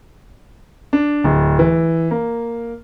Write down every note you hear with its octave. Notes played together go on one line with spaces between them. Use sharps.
D4
D1
E3
A#3